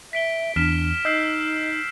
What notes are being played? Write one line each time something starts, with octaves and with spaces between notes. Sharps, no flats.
E5 B6 D7 G7
E2 D4 F6 B6 E7
D#4 D#5 E6 G6 C7